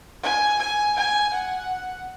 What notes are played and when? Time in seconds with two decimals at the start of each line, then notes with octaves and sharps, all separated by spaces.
0.23 G#5
0.59 G#5
0.96 G#5
1.33 F#5